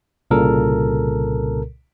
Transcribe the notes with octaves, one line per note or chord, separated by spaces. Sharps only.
C2 A#2 C#3 A4 A#4